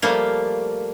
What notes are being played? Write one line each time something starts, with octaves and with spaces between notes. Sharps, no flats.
F3 G3 A3 A#3 F5